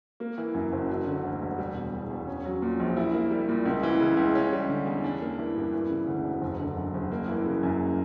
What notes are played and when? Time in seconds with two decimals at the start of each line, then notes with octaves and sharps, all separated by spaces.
0.20 A#3
0.38 E3
0.54 F#2
0.73 F#1
0.89 F#3
1.07 D3
1.23 D2
1.42 E1
1.58 G3
1.75 B2
1.93 E2
2.10 E1
2.27 C#4
2.45 F#3
2.62 A#2
2.80 A#1
2.97 E4
3.14 A#3
3.31 G3
3.48 A#2
3.65 C#2
3.83 E3
4.00 C#3
4.17 C#2
4.35 C#4
4.53 G3
4.69 D3
4.86 E2
5.04 D4
5.21 A#3
5.39 E3
5.56 G2
5.73 E3
5.90 C#3
6.07 D2
6.24 E1
6.42 F#1
6.60 D3
6.77 F#2
6.94 F#1
7.12 A#3
7.28 E3
7.45 C#3
7.63 F#2